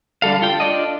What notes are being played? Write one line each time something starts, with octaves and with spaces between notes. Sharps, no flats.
D3 G3 A4 F5
F4 A4 G5
D4 F4 D5 D#5